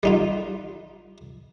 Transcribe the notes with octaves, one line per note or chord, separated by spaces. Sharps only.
G3 D#4 F4